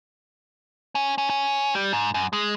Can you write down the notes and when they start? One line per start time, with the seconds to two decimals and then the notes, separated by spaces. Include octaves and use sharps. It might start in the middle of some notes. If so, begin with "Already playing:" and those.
0.95 C#4
1.18 C#4
1.30 C#4
1.75 G3
1.93 G#2
2.14 F#2
2.33 G#3